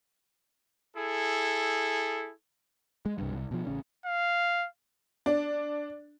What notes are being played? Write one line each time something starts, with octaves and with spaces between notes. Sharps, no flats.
E4 G#4 A4
G#3
C2 G2
C2
B2 F3
A1 C#3 C#4
F5
D4